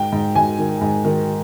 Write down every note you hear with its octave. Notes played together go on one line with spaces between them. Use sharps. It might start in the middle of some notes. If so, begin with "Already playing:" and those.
Already playing: G#2 G5
G#2
G#2 G#5
D#3
G#2
D#3